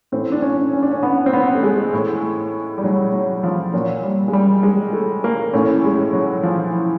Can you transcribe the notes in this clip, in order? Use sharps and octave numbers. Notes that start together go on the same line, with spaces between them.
A2 E3 C4
D4
C#4
C#4
D4
C#4
B3
C4
B3
A3
G#3
A2 E3
G3
F#3
F#3
F3
A#2 F#3
G3
G#3
G3
G#3
A3
A#3
A2 E3 C#4
G#3
F#3
F3
E3